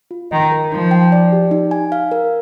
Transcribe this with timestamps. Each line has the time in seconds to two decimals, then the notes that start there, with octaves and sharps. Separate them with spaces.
0.11 F4
0.31 D#3 D#5
0.52 A#4
0.72 F3 D#4
0.91 G5
1.12 D5
1.32 G4
1.51 D#4
1.71 G#5
1.92 F5
2.11 A#4